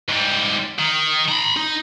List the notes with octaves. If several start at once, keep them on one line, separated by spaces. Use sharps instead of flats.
G#2 G3
D#3
A#5 B5
D#4